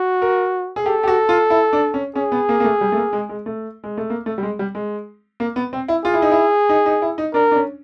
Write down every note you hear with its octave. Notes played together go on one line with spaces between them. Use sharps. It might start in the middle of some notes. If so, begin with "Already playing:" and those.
Already playing: F#4
A#4
G#4
G4 A4
G4
F#4
F4
E4
D4
C#4
C#4 G#4
B3
A#3
A#3
A3
G3
A3
A#3
G#3
G#3
A3
G#3
A3
A#3
A3
G3
G#3
G3
G#3
A#3
B3
C4
E4
F4 G#4
E4
D#4
E4
D#4
D#4
E4
D#4
D4 A#4
D4
C#4